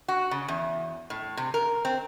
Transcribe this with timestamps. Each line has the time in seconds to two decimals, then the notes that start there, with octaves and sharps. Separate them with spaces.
0.08 F#4
0.31 C#3
0.48 E2
1.10 A2
1.37 C3
1.54 A#4
1.85 C4